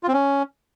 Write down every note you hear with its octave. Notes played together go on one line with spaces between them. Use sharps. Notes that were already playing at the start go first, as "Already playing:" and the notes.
F4
C4
C#4